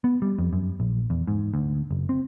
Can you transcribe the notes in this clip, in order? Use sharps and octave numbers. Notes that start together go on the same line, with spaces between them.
B3
G3
F2
F#2
A#1
E2
G#2
D2
F#1
C4